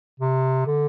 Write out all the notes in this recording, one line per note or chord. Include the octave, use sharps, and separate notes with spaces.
C3
D3